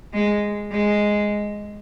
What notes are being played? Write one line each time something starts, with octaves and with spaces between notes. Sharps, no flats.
G#3
G#3